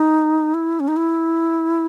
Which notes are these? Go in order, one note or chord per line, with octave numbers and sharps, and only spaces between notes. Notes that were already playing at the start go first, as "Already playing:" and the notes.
Already playing: D#4
E4
C#4
D#4
E4